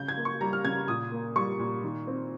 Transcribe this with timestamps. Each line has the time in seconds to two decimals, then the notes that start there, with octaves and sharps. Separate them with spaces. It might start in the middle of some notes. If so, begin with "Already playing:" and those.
Already playing: C#3 G6
0.08 G#6
0.17 A#3
0.25 C#6
0.41 G3 A#5
0.53 F6
0.65 C#3 G#6
0.88 A#2 D#6
1.12 A#3
1.36 G3 C#6
1.59 A#2
1.84 D#3
2.07 C4